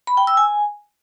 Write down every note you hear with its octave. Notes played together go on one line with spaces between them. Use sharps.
B5
G5
E6
G#5